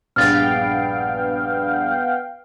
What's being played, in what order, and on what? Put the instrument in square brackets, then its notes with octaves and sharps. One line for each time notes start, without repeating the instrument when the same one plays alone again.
[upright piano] A#1 G2 [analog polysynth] B3 F5 G5 [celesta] F6 A6